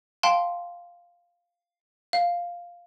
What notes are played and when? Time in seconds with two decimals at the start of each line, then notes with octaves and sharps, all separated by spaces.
0.23 F5 G5 A5 C6
2.13 F5